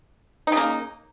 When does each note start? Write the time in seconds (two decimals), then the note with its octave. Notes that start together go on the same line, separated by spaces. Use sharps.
0.47 D#4
0.52 C#3
0.57 A#3